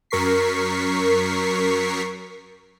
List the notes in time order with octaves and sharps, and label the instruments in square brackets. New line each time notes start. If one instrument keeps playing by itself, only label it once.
[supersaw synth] F#2 A#4 C#6 B6 C7